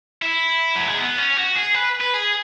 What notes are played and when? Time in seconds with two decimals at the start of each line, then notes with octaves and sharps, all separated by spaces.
0.22 E4
0.76 F#3
0.88 G#3
0.98 B3
1.18 C#4
1.37 F#4
1.56 G#4
1.74 B4
2.01 B4
2.14 G#4